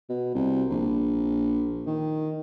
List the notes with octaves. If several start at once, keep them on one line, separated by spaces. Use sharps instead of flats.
B2
C2
A#1
D#3